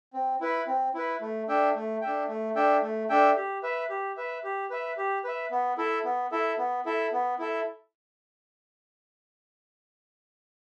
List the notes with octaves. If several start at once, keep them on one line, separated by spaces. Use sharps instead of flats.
C4
E4 B4
C4
E4 B4
A3
D4 A4 E5 G5
A3
D4 A4 E5 G5
A3
D4 A4 E5 G5
A3
D4 A4 E5 G5
G4
B4 E5
G4
B4 E5
G4
B4 E5
G4
B4 E5
B3
E4 A4 E5
B3
E4 A4 E5
B3
E4 A4 E5
B3
E4 A4 E5